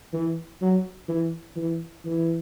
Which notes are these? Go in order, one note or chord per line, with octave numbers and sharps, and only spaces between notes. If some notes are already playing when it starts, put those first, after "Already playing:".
E3
F#3
E3
E3
E3